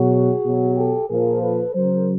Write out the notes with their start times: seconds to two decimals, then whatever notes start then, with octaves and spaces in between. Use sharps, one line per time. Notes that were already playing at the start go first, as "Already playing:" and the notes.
Already playing: B2 F#3 F#4 G#4
0.44 B2 F#3
0.76 G4 A4
1.09 A#2 F3 G#4 A#4
1.42 A4 B4
1.74 C#3 F#3 A#4 C5